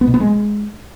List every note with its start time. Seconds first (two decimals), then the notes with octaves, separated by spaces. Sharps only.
0.01 B3
0.07 B2
0.14 B3
0.20 G#3